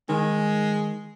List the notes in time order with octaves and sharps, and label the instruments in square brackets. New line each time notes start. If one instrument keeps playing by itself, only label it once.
[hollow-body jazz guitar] D#3 [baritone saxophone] G#3